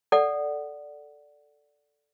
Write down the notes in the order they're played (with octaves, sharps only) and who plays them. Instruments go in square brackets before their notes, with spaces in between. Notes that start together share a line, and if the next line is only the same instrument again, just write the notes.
[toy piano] A4 D5 F#5